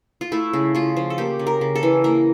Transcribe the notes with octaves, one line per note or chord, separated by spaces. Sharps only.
F4
A3 E4
C#3
C#3 F4
F3
A4
A#3 G4
C#3
A#4
C#3
A4
E3
A#3 A#4